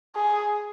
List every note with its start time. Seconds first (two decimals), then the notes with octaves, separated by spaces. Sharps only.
0.16 G#4